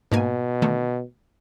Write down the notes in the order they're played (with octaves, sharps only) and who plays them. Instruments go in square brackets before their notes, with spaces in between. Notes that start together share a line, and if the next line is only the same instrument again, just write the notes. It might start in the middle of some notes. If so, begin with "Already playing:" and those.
[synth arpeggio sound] G#2 A#3 G#5 [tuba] B2
[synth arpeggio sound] D3 D#3 A3